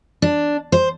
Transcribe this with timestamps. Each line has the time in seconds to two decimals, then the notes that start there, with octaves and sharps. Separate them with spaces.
0.22 D4
0.72 C5